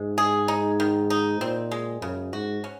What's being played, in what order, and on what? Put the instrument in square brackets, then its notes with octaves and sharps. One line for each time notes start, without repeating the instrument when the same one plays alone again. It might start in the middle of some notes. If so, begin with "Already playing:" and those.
Already playing: [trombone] G#2 [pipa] G#3
[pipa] G#4
D#4
D#3
D#4
[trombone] A#2 [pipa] C4
[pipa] G#3
[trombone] F#2 [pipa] C#3
[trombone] G#2 [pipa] F#4
[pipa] C#4